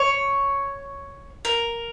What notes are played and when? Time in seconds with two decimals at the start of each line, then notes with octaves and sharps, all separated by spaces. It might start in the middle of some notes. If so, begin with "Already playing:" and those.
Already playing: C#5
1.45 A#4